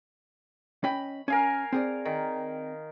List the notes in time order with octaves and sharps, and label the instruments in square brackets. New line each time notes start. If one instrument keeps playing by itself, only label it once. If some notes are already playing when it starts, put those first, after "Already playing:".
[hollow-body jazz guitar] C#4 D#5 G5 [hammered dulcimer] B5
[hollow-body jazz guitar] C#4 [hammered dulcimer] A#4 F5 G#5
[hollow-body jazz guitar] C4 G#4 D5
[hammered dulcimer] D#3